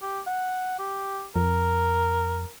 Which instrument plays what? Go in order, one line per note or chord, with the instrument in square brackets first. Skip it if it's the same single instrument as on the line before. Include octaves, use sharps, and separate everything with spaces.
[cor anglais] G4
F#5
G4
[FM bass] F2 [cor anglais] A#4